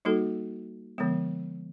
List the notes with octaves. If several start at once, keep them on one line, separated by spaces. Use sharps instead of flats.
G3 A#3 D#4 F#4 A4
D3 F3 G#3 B3